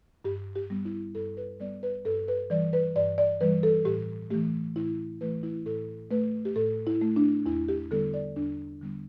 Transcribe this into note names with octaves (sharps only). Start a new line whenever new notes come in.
G2 G4
G4
G3 B3
E4
G2 A4
B4
G3 B3 D5
B4
G2 A4
B4
E3 G3 D5
B4
G2 D5
D5
E3 G3 B4
A4
A2 G4
E3 A3 G4
A2 E4
E3 A3 B4
E4
A2 A4
A3 B4
G4
A2 A4
E4
A3
D4
E2 E4
G4
D3 G3 B3 A4
D5
E2 D4
D3 G3 B3